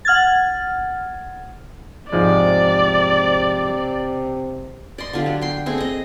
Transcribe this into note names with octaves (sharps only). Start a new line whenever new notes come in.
F#5 F6 G#6 A6
G#2 C3 F3 G#3 D5
D5 D#5 C6
D3 F4 G4
F#3
G5 C6
A3 C4 G#4
D#5 A#5